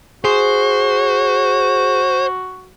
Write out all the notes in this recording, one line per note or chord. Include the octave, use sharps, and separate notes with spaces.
F#4 G#4 C5